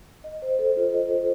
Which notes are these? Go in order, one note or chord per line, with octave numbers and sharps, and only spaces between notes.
D#5
C5
A4
F4
D#5
C5